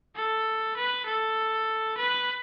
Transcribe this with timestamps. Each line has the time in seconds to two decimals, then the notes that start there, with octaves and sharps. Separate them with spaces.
0.16 A4
0.77 B4
1.06 A4
1.97 B4